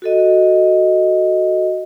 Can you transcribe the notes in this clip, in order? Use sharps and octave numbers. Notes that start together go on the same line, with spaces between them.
F#4 A4 D#5